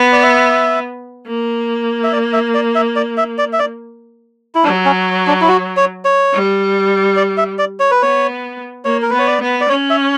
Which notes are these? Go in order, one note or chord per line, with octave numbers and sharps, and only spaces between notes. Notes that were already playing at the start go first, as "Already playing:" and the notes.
Already playing: B3
D5
E5
A#3
E5
D5
E5
D5
E5
D5
E5
D5
E5
D5
E4
F#3 D4
C#4
D4
E4
F#4
C#5
C#5
G3
D5
E5
D5
C#5
B4
B3 C#5
A#3 C#5
A#4
B3 B4
C#5
D5
B3
D5
C#4 C#5
E5